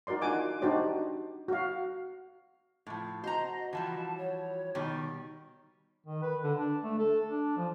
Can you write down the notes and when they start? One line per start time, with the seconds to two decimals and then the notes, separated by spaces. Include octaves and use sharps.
0.07 D#4 F#4 A#4 D5 C6
0.22 D4 D#4 F4 F#5 G#5 D6
0.62 D4 D#4 F#4 G4 C5 D5
1.48 F#4 F5
2.87 A2 F3
3.24 F#4 C5 D#5 A#5
3.73 E3 F3 G3 A5
4.17 C#5
4.75 B2 D#3 G3
6.07 D#3
6.23 B4
6.43 D3
6.58 D4
6.83 A3
6.99 A4
7.29 D4
7.57 F3